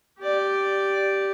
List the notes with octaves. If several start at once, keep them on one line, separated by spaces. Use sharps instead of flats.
G4 D5